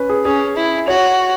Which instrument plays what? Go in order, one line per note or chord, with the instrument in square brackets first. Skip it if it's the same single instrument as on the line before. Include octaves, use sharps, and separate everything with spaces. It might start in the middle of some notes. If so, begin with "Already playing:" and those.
Already playing: [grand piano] C#4 B4
G#4
[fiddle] C#4 [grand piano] G#4
[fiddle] E4
[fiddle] F#4 [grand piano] C#5